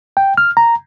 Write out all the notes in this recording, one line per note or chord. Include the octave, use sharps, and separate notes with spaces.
G5
F6
A#5